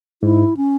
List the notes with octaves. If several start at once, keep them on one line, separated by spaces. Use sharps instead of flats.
G#2 E4
C#4